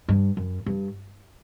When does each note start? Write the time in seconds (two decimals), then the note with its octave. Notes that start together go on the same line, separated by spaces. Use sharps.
0.08 G2
0.37 F#2
0.66 G2